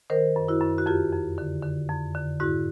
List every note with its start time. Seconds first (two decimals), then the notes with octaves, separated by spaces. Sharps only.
0.10 D#3 A#4 C5
0.36 F#2
0.48 E4 F#4
0.61 F#2
0.78 F#4
0.86 F2 F4 G4
1.13 F2
1.38 D3
1.63 D3
1.89 F2
2.15 D3
2.40 G#2 E4 F#4